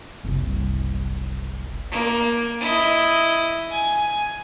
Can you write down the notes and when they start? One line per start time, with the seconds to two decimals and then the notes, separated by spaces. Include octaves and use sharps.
0.24 F#1 C2
1.92 A#3
2.61 E4 D#5
3.71 G#5